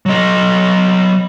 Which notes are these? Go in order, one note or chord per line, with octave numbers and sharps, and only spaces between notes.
F#3 D#5